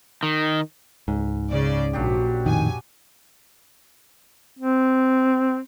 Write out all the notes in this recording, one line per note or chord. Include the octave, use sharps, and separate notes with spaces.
D#3
C#2 G#2
C#3 D5
A#1 F#3 D4 G4
F2 A2 D#3 G#5
C4